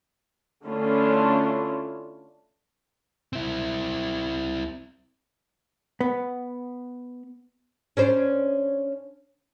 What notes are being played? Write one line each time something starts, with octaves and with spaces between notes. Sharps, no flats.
D3 A3 C#4 D4 E4 F4
C4 E4
B3
C#4 D4 C5